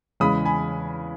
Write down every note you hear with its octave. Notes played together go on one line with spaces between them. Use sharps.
E2 C#3 G#3 B5 D#6
G#5 B5